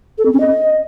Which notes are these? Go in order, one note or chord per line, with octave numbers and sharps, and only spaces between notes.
A4
C4
C#4
D#5